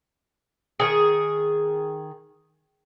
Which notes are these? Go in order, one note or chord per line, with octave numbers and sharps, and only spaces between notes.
D#3 G#4